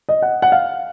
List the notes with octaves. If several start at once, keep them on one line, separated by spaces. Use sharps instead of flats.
D#5
F#5
F#5
F5